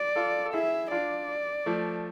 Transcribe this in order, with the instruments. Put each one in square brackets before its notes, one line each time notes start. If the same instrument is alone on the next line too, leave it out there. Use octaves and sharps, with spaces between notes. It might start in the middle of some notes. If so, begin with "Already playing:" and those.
Already playing: [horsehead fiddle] D5
[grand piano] F4 A4
A4
[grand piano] E4 G#4 [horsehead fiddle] E5
[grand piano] D4 F4 [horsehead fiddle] D5
[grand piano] F3 A3